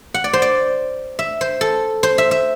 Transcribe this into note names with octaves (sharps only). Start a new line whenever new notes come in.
F#5
D5
C5
D5
E5
C5
A4
C5
E5
E5